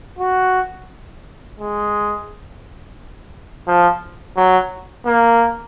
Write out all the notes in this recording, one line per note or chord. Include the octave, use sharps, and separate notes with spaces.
F#4
G#3
F3
F#3
A#3